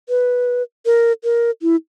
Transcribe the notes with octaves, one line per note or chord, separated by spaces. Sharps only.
B4
A#4
A#4
E4